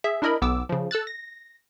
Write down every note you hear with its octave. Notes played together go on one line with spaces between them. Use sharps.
G#4 E5
D4 E4 A#4 D#5 B5
B1 B3 D6 E6
C#3 F3
A4 E6 F#6 A6
A#6